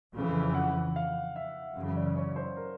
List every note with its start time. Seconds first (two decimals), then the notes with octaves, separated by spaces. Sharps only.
0.14 F2 C#3 E3
0.54 F#5
0.96 F5
1.36 E5
1.76 F#2 C#3 E3
1.96 D5
2.16 C#5
2.36 C5
2.57 A#4